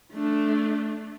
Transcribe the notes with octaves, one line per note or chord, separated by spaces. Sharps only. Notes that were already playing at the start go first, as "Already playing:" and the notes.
A3 D4